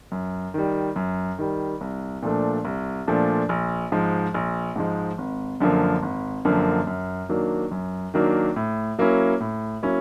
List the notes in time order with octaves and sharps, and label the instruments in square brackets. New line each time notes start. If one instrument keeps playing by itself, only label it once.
[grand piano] F#2
D#3 G3
F#2
D#3 G3
C2
A#2 F3 A3 D4
C2
A#2 F3 A3 D4
A#1
G#2 F3 G#3
A#1
G#2 F3 G#3
G#1
F#2 D3 F3 A#3
G#1
F#2 D3 F3 A#3
F#2
D#3 F#3 A#3 D4
F#2
D#3 F#3 A#3 D4
A2
F#3 A#3 C#4 E4
A2
F#3 A#3 C#4 E4